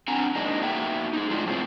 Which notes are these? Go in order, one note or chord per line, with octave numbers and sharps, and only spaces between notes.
C4 D4 F#5 G#5 A#5
G#3 A#3 D4 D#4
A#3 B3 D#4 F#4 E5 G5
D#4 G#4
A2 G#3 D4 D#4 F4
F#2 A2 G#3 C4 F4